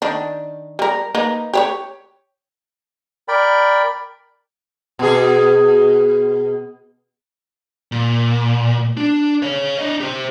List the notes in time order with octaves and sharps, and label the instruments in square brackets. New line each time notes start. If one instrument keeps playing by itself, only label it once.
[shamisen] D#3 D4
G3 A#4
A#3 D#4 B4
G4 C5 C#5
[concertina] A#4 D5 G5 B5
[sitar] B2 G#4
[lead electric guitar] A#2
D4
C#5 F5
D4 D#5
G4 C5